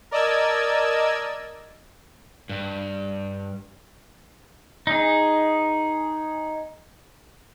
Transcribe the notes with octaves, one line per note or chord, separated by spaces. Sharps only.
A#4 D5 D#5 A5 E6 G#6
G2
D#4 G#4